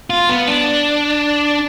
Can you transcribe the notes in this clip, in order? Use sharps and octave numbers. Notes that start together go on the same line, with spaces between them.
F4
B3
D4